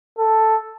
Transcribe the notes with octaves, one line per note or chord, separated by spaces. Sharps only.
A4